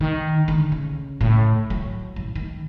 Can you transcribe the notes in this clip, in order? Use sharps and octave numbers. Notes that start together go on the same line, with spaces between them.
D#3
D3
C#3
A2
F#3
A1
D#3